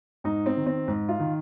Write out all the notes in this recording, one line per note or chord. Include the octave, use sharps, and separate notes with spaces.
G#2 D#4
C4
D#3
C4
G#2
F4
D#3